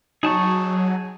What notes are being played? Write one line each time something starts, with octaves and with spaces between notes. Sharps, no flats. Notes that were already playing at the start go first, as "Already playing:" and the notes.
F#3 D#4 G#4 A5 C#6